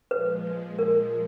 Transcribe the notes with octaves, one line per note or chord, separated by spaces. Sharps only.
A#2 F3 G#3 B4
A#4